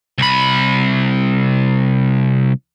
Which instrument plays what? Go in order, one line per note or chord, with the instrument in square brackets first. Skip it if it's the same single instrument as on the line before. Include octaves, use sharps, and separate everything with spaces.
[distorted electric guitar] C2 B5